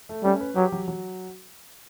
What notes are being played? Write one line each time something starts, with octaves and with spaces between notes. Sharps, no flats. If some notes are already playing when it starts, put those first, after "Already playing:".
A3
G3 C#4
B4
F#3 G4
F#3
F#3